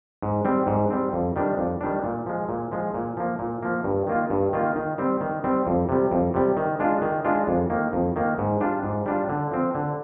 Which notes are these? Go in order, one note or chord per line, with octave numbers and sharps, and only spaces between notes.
G#2
G3 C4
G#2
G3 C4
F2
D#3 G3 D4
F2
D#3 G3 D4
A#2
F3 G#3
A#2
F3 G#3
A#2
F3 A#3
A#2
F3 A#3
G2
D#3 A#3 F4
G2
D#3 A#3 F4
D#3
G3 C4
D#3
G3 C4
F2
C3 G3
F2
C3 G3
D#3
G#3 D4 F4
D#3
G#3 D4 F4
F2
D#3 A#3
F2
D#3 A#3
G#2
G3 D4 F4
G#2
G3 D4 F4
D3
F3 C4
D3